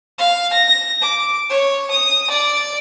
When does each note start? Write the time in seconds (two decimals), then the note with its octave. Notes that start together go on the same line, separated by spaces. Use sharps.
0.19 F5
0.53 A#6
1.02 D6
1.50 C#5
1.91 D#6
2.31 D5